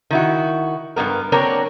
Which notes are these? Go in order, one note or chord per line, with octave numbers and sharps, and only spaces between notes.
D#3 E4 F#4
G2 A#2 B3 A#4
F#3 A#3 C4 D4 A#4 C#5